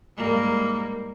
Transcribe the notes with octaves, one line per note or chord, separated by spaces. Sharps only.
G#2 G3 A#3